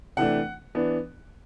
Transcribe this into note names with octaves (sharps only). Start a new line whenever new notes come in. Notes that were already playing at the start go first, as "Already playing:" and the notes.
C3 E3 A3 D4 F#5
E3 B3 D4